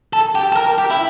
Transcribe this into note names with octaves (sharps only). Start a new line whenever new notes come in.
A4
G4
A4
A#4
G4
E4